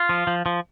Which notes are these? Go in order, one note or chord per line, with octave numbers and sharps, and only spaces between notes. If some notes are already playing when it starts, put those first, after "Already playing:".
Already playing: F4
F3
F3
F3